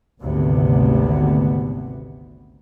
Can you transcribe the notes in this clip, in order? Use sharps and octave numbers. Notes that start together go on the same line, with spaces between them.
G#1 D2 C3 B3